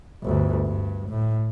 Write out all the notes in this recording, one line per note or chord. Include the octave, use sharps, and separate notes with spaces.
G1 D2
G2
A2